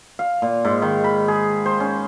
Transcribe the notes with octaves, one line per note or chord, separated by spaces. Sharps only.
F5
A#2
G#2
D#3
B5
G#4
C5
C#4